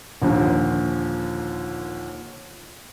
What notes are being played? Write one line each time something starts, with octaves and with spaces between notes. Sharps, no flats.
D#2 A#2 D3 F3